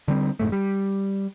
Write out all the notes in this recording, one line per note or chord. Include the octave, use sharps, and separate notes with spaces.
D3 G3 C4
F1 G#2 A3
G3